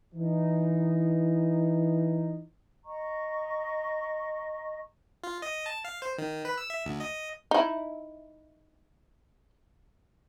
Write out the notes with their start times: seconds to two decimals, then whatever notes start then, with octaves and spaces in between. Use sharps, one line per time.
0.15 E3 D#4
2.85 D#5 A#5 C#6
5.24 F4
5.42 D#5
5.66 A5
5.85 F5
6.02 C5
6.18 D#3
6.45 B4
6.58 E6
6.70 E5
6.86 D2
7.00 D#5
7.51 D#4 E4